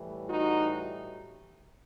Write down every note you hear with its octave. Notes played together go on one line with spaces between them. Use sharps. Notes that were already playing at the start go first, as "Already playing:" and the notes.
Already playing: A2 E3 G3
D#4 F#4